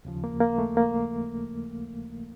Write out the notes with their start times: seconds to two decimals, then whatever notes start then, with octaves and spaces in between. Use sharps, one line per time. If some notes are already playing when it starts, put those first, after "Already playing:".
0.05 D#2 C#3 F3
0.24 A#3
0.40 A#3
0.59 A3
0.77 A#3